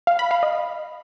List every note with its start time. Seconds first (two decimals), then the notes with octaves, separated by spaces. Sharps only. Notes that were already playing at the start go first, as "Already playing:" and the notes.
0.07 F5
0.19 B5
0.31 F5
0.43 D#5